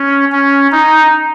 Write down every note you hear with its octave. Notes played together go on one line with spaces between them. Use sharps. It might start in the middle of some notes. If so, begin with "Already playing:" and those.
Already playing: C#4
C#4
D#4